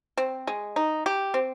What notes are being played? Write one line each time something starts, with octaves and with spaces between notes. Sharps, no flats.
C4
G#3
D#4
G4
C4